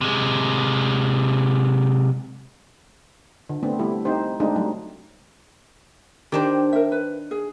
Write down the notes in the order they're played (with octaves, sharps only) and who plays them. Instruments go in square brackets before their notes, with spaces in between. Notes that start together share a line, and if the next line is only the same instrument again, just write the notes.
[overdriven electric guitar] C3 G#3
[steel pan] D3
D3 A3 B3 C4 D4
G3 A3 E4 G4 A4
C4 D#4 G4 C5
G#3 A3 C4 D4 D#4 G#4
F#3 G3 A3 D#4
[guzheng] D#3 D4 C5 [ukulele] G4
[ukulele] A#4 E5
B4
G#4